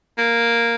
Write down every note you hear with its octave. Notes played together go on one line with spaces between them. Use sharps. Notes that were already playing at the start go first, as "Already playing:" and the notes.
A#3